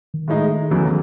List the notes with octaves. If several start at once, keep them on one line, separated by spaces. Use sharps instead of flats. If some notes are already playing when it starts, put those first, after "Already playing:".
D#3
A2 G#3 D#4
E2 C#3 F#3 A3